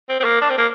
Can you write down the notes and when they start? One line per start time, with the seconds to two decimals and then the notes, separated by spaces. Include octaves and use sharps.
0.09 C4
0.20 C4
0.24 A#3
0.41 D4
0.50 C4
0.58 A#3